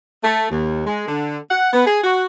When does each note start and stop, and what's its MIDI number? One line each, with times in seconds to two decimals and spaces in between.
0.24 0.46 57
0.51 0.85 39
0.86 1.05 56
1.08 1.39 50
1.51 1.69 78
1.73 1.84 59
1.86 2.03 68
2.04 2.25 66